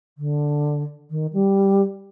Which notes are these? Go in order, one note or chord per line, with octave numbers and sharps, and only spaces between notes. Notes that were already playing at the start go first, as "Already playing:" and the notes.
D3
D#3
G3